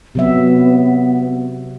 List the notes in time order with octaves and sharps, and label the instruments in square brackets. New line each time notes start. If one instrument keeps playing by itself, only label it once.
[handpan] C3 F#3 E5 [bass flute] B3